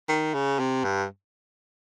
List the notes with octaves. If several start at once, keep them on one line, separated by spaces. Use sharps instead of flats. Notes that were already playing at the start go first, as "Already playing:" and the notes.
D#3
C#3
C3
G2